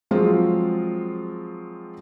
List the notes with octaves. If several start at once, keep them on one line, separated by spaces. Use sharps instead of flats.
F3 F#3 G#3 C4 F4